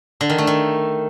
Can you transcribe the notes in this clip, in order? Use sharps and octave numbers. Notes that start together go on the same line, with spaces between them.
D3
D#3
A3
D#3